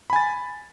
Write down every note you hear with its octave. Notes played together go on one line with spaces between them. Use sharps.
G#5 B5 A6